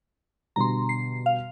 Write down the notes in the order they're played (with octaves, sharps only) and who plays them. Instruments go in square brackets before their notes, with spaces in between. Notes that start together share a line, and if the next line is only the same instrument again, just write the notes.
[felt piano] B2 D3 G3 [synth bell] A#5 C6
[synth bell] C7
F5